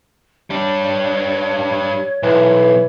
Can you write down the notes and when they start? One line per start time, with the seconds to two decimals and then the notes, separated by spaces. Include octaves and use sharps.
0.50 G3 D4 C#5
2.23 B1 E3